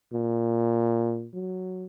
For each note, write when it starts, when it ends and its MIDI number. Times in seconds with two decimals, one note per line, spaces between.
0.13 1.28 46
1.35 1.86 54